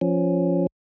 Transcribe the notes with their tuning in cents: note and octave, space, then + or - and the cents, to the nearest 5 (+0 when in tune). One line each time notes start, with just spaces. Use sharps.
F3 +0 C#4 +0